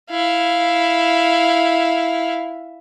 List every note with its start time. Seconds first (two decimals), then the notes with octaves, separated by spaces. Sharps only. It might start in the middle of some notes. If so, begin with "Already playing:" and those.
0.11 E4 F5